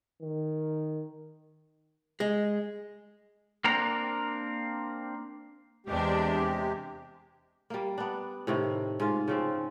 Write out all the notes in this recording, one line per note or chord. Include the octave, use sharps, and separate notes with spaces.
D#3
G#3
A#3 C4 D4 A#4 A#5
E2 C3 G#3 D4 G4
G3 A#3
B3 D4
A2 C3 D#3
G#2 F4
C#3 F3 C4